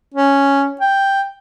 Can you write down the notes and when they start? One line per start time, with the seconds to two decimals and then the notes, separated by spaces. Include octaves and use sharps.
0.14 C#4
0.81 G5